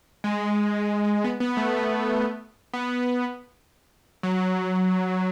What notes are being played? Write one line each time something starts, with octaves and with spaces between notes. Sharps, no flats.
G#3
B3
B3
A3
A3
B3
F#3